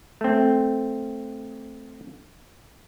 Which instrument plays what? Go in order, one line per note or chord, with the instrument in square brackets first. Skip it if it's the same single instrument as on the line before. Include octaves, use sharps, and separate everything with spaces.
[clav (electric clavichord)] A3 C4